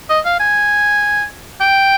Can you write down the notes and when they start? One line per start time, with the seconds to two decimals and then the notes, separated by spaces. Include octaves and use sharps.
0.09 D#5
0.25 F5
0.40 G#5
1.61 G5